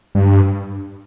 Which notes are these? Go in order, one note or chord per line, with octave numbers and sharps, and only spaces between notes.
G2